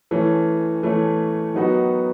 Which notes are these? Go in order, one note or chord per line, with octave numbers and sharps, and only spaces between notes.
E3 A3 C#4
E3 A3 C#4
D#3 F#3 B3 D#4 F#4